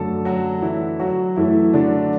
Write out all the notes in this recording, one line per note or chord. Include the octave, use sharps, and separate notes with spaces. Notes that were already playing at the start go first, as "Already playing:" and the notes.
Already playing: F#2 D3 A3 A4
F#3 F#4
E3 E4
F#3 F#4
F#2 E3 F#3 A3 E4
D3 D4